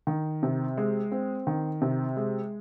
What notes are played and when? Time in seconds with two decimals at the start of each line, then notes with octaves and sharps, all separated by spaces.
0.07 D#3
0.43 C3
0.78 G#3
1.12 C4
1.47 D#3
1.81 C3
2.17 G#3